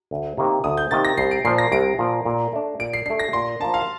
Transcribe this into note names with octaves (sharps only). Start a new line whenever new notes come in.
D2
C3 D#3 A#3
D2 D#6
G6
C3 D#3 A#3 A6
A#6
C2 C7
D7
A#2 F3 C7
A#6
C2 D7
A#2 F3
A#2
A3 D4
A#2 D7
C7
A3 D4 C7
A#6
A#2 C6
F3 A#3 D4 A5
F5